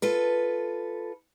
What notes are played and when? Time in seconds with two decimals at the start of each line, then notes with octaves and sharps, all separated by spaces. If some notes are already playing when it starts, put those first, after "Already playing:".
0.02 F4 A4 B4